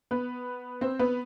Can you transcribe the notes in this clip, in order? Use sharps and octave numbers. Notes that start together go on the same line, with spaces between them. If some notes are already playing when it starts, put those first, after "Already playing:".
B3 B4
C4 C5
B3 B4